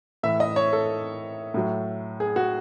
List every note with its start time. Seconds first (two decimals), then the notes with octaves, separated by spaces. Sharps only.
0.23 A2 E3 E5
0.40 D#5
0.56 C#5
0.73 A4
1.54 A2 F#3
2.20 G#4
2.36 F#4